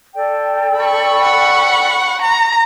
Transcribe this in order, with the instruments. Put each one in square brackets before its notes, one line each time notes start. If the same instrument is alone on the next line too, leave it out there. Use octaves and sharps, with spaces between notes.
[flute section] A4 D5 G5
[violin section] B5 C#6
[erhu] F#5
A#5